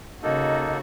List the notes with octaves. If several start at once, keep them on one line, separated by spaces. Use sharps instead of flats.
C#3 A#3 D#4 F#4 A4 D#5